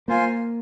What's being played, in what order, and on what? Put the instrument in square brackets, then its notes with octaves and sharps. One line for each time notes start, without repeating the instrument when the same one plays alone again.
[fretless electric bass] A#3 [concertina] F4 C5 F5 G#5